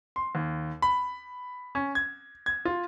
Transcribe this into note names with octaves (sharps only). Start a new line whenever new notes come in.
C6
D#2
B5
C#4
G#6
G#6
F4